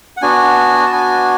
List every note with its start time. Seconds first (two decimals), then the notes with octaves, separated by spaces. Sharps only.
0.17 F#5
0.22 B3 D4 F#4 G#5
0.86 A5
0.93 G#5